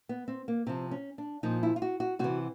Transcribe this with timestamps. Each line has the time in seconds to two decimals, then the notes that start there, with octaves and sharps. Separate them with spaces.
0.09 B3
0.28 C4
0.48 A#3
0.67 C3 F3 C4
0.91 C#4
1.18 D4
1.43 A#2 F3 D#4
1.63 E4
1.76 F4
1.82 F#4
2.00 F#4
2.19 C3 E3 F#4